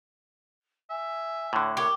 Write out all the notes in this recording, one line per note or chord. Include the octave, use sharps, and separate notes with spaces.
E5 G#5
A2 D3 C#5
G4 A#4 C#5